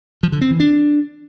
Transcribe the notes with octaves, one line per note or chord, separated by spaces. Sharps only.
F3
D3
C4
E3
D4